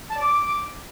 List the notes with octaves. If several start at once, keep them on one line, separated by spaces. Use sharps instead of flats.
A5
D5
D6